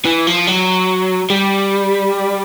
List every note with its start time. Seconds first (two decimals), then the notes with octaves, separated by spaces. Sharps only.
0.05 E3
0.27 F3
0.47 F#3
1.30 G3